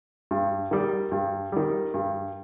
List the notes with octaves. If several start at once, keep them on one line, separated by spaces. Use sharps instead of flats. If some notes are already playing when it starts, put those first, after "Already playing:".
G2
D#3 G3
G2
D#3 G3
G2